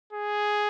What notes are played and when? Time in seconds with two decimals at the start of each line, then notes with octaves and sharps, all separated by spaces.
0.13 G#4